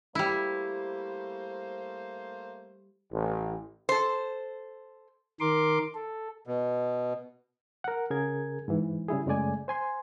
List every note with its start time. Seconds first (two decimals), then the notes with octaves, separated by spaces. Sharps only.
0.15 G3 A3 A#3 E4 C5
3.12 A1
3.89 A4 C5
5.40 D#3 A#4 C6 D6
5.95 A4
6.47 B2
7.84 A#4 F#5
8.10 C#3 G#4 A#4 G#6
8.68 G#2 E3
9.09 C#3 G3 E4 G#4
9.26 F#2 C#3 G#3 A3 D5 G#5
9.68 C5 G#5 C6